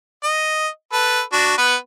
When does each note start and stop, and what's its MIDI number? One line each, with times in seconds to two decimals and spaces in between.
0.24 0.68 75
0.93 1.21 69
0.93 1.21 71
1.33 1.57 62
1.33 1.57 66
1.58 1.75 59
1.58 1.75 71